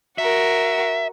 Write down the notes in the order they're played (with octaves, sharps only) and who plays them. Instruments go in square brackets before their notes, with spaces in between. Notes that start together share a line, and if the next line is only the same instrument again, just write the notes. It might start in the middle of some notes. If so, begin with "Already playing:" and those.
[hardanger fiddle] F#4 A#4 [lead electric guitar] E5